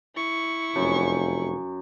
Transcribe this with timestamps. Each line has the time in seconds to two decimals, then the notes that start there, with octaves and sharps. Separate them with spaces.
0.16 E4 C#6
0.76 F1 F#2